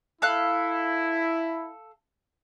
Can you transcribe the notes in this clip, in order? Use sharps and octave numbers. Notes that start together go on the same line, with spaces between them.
E4 A4 F5 F#6